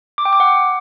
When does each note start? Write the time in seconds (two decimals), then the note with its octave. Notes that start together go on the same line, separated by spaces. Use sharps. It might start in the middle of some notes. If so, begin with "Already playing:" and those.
0.18 D6
0.25 G5
0.33 D6
0.40 F#5